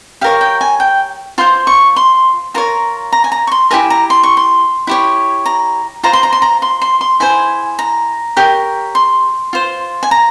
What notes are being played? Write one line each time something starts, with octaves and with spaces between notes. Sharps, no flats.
G4 A#4 C#5 F5
G5
G#5
G5
F4 C5 C6
C#6
C6
F4 A#4 C#5 A#5
A#5
G#5
A#5
C#6
C6
E4 G4 A#4 G#5
A#5
C6
C#6
C6
E4 G4 C#5
A#5
F4 C5 A#5
C6
A#5
C6
A#5
C6
C6
C6
E4 G#4 C5 G#5
A#5
G4 A#4 C#5
C6
F4 C5
G#5
A#5